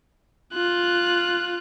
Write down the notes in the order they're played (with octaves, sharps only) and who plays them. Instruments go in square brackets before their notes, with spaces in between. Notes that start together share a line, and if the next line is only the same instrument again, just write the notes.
[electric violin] F4 F#6